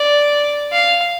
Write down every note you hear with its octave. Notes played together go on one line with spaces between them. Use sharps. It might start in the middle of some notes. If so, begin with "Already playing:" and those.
Already playing: D5
F5